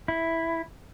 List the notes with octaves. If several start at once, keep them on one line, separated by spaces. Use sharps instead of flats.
E4